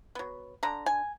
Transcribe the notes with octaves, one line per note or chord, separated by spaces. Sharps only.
F#3 B3
D3 A#5
G#5